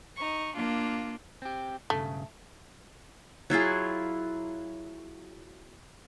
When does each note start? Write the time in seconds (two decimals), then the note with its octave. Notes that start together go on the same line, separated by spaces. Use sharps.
0.17 D#4 C#6
0.56 A#3 D4 F4
1.42 C4 G4
1.90 B1 G2 C#3 A3
3.50 F#3 E4 F4 G#4